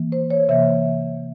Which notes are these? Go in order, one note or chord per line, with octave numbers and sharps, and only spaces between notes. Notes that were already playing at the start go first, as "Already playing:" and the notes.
Already playing: E3 A#3
C5
C#5
C3 E3 A#3 E5